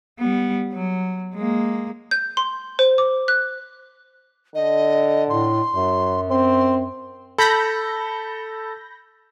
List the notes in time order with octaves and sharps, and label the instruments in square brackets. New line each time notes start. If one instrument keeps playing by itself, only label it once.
[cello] G3 B3
F#3
G#3 A#3
[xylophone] G6
C6
C5
D6
F#6
[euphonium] D3 [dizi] D#5
[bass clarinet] A2 [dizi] C6
[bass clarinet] F#2 [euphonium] F#3
[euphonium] C4 [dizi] C6
[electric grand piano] A4 [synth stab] B5 G6 A#6